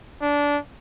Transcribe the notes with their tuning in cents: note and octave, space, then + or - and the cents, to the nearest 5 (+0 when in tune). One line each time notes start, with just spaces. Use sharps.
D4 -20